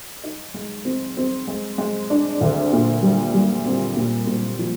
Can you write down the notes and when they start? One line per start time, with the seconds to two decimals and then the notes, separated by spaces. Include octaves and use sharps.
0.23 D#4
0.54 G#3
0.85 C4
1.17 C4
1.48 G#3
1.78 G#3
2.10 D4
2.41 D2
2.73 A#2
3.02 G3
3.34 G3
3.66 C4
3.97 A#2
4.27 A#2
4.59 F3